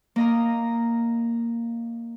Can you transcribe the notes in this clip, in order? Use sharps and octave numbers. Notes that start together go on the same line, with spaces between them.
A#3 D#5 A#5